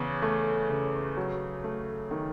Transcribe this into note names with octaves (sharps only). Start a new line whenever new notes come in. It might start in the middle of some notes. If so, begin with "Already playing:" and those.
Already playing: E2 C#3
A3
C#3
F#3
A3
D#3